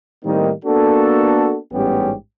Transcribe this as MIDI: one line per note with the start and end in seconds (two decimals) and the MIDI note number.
0.24 0.51 45
0.24 0.51 51
0.24 0.51 55
0.24 0.51 58
0.24 0.51 60
0.24 0.51 63
0.65 1.57 58
0.65 1.57 59
0.65 1.57 62
0.65 1.57 66
0.65 1.57 69
1.73 2.12 33
1.73 2.12 44
1.73 2.12 55
1.73 2.12 59
1.73 2.12 61
1.73 2.12 67